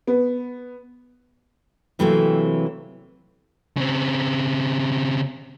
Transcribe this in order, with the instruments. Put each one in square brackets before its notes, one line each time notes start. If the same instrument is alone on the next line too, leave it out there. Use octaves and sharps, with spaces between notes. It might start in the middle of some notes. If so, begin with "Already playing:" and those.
[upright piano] B3
[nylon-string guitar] C3 E3 F#3 A3 A#3 C4
[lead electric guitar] C#3 C4